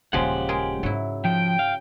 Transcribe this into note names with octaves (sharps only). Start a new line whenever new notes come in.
D#1 C#3 F3 G#3 C#4 G4 F#5
G#3 G#4 A#4
G#2 F#3 D#4 E4
F3 G5
F5